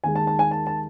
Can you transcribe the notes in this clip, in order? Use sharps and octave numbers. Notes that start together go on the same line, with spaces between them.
D#2 D#3 G#3 G#5
A5
A5
G#5
A5
A5